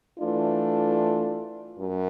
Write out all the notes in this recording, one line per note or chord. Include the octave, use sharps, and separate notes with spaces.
E3 A3 D4 F4
F#2